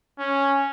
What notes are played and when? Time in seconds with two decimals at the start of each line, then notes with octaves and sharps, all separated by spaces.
0.19 C#4